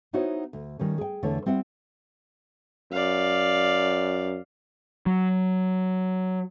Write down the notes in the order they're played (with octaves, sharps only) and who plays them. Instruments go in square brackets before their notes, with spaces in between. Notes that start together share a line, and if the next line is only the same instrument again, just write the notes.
[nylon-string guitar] B3 D#4 E4 F#4 C5 C#5
D2
D#3 G3 C#4
G#4 G5
E2 D3 A3 E4 C#5
G3 C4 E4 E5 F#5
[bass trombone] F#2 [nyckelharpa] D5 F5
[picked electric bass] F#3